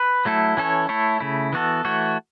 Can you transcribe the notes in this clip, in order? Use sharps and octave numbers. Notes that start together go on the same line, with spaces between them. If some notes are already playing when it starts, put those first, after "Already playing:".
Already playing: B4
F#3 A3 E4 A4
E3 C#4 A4 C#5
A3 E4 A4 C#5
C#3 A3 E4
E3 B3 F#4 A4
E3 A3 F#4 C#5